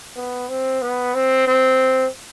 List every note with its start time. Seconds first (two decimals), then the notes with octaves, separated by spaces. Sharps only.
0.16 B3
0.49 C4
0.82 B3
1.14 C4
1.47 C4